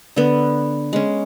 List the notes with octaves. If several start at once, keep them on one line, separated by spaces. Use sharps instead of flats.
D3 B3
G#3 C#4